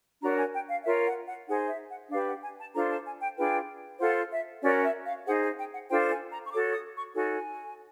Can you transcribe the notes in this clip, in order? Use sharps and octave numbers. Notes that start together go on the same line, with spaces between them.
D4 F#4 A#4 C#5 A#5
G#5
G5
F5
F4 A#4 C#5 E5
F#5
F#5
D#4 G#4 C5 F#5
E5
F#5
D4 G4 B4 F5
F#5
G#5
A5
D4 F4 A4 C5 A#5
A5
G#5
G5
D4 F4 G#4 B4 G5
F4 A4 C5 F#5
E5
C#4 F#4 A#4 C#5 D5
E5
F5
D#4 G#4 C5 F#5
G#5
G5
F#5
D4 F4 A4 C5 G5
G#5
A#5
C#6
F#4 A4 C#5 D6
D#6
C#6
D#4 F#4 A4 C#5 G#5